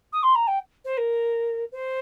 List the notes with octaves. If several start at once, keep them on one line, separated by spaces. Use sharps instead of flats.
D#6
C6
A#5
G5
C5
A#4
C5